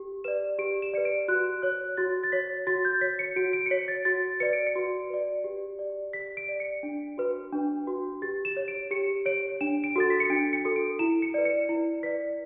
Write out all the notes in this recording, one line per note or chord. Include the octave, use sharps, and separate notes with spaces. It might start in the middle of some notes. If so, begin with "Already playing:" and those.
Already playing: G4
B4 D5 E7
G4 D7
E7
B4 D5 C#7
D7
F#4 F#6
C#5 F#6
F#4 A6
A6
C#5 B6
F#4 A6
G6
C#5 B6
C#7
F#4 D7
D7
C#7
C#5 B6
A6
F#4 A6
B4 D5 C#7
D7
C#7
F#4
B4 D5
G4
D5
G4 B6
D7
D5
C#7
D4
F#4 B4
D4
F#4 B4
G4 A6
E7
C#5
D7
G4 C#7
C#5 D7
D4 E7
D7
F#4 A4 A6
B6
C#7
D4 D7
C#7
F#4 A4
D7
E4 E7
C#7
B4 D5
C#7
E4 C#7
B4 D5 B6